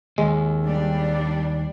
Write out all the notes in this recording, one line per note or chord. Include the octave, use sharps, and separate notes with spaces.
D#2 G#3
G3 D4